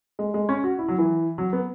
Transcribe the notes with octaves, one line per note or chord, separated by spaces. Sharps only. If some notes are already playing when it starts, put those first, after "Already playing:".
G#3
G#3
C#4
F#4
E4
F#3
E3
F#3
B3